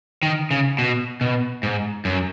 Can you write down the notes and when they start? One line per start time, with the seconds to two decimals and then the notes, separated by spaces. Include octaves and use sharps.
0.23 D#3
0.51 C#3
0.78 B2
1.21 B2
1.63 G#2
2.05 F#2